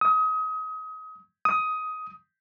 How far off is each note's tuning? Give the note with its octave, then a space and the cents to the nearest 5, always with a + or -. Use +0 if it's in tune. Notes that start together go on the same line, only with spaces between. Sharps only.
D#6 +30
D#6 +15